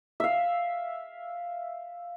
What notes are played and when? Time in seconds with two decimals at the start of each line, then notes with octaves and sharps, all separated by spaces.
0.20 E5 F5